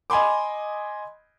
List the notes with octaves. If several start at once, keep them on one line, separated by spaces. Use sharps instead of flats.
D#5 G#5 B5 C6 D6